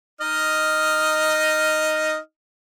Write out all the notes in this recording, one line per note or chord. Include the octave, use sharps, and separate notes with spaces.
D#4 D#5 F6